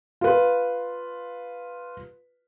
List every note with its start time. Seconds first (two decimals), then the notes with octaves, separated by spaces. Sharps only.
0.21 F4 B4